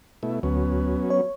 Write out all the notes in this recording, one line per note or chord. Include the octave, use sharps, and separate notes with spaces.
B2 A3 E4
D2 F#3 B3 C#4
C#5